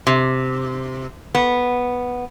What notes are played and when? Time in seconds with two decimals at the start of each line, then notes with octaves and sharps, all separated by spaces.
0.07 C3
1.35 B3